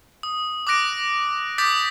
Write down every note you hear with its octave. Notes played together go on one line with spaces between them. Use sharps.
D#6
D6 D#6 F#6 A#6 D7
D6 D#6 G6 A6 B6